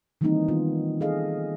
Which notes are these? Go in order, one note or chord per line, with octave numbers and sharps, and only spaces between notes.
D#3 E3 G3 A#3 C4 D#4
D#3 B3 F4
G#4 A4 D#5 F5